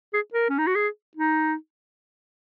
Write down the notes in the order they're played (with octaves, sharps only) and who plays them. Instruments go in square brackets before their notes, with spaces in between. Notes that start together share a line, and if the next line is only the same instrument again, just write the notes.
[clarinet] G#4
A#4
C#4
D#4
F#4
G#4
D#4